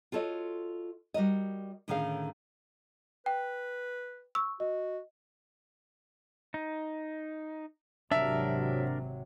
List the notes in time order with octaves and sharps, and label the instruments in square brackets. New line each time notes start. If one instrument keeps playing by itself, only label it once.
[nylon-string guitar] F4 F#4 A4 C#5 D#5
G3 F#4 A#4 D#5
A2 D3 D#3 C#4 G#4 F5
[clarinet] B4 [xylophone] G5
[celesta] C#6 [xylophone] E6
[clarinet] F#4 [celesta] D#5
[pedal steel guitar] D#4
[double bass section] G#1 C3 F#3 [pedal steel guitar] D4 A#4 [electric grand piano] E5